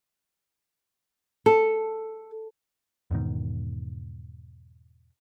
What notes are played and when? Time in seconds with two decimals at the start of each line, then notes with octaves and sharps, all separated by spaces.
1.46 A4
3.11 E2 G#2 B2 D#3